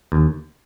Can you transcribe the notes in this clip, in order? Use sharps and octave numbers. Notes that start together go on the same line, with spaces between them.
D#2